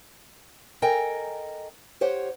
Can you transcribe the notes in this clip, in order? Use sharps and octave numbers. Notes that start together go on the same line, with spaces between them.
A4 A#4 D#5 G5 G#5 A#5
G4 C5 C#5 F#5